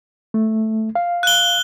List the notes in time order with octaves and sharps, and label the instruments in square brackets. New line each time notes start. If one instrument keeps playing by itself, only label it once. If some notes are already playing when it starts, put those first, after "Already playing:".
[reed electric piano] A3
F5
[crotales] F#6 G7